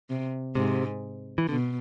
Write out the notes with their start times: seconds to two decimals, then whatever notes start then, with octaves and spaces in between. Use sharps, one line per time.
0.10 C3
0.55 G#2 C3
1.38 E3
1.49 B2 D3